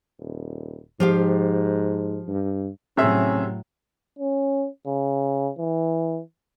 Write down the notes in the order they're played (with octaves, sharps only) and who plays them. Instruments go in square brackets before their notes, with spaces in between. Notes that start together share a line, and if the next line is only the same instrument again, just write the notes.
[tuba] D#1
[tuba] G#2 [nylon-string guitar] F3 G4 F5
[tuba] G2
[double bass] A2 F#3 [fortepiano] C3 G#4 E5 [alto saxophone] C#4
[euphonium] C#4
C#3
E3